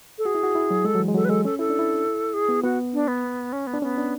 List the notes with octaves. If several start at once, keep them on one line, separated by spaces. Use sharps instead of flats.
A4
F#4 G#4
E4
F#4
E4
F#3
G#3 A4
F#3
E3
G#3
F#3 A4
B4
G#3 A4
C#4 A4
E4 A4
D4
E4
G#4
B3
B3 F#4
D4
B3
C#4
B3
D4
B3 C#4
D4